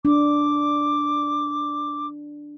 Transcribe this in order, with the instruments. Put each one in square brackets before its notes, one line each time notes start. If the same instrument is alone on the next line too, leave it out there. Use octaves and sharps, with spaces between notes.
[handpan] D4 [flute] D6